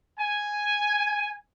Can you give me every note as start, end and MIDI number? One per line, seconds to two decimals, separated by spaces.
0.18 1.36 80